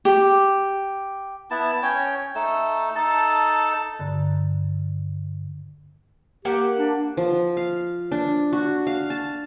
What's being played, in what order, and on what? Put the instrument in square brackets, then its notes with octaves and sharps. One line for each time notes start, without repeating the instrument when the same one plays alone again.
[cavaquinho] G4
[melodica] B3 E4 A5
C#4 C#5 G5
A3 D#4 A4 E6
D#4 A4 A5
[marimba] G2 D3
[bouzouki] A#3 F#5 [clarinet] G4
[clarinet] D4
[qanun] F3
F5
D4
F#4
F5
A5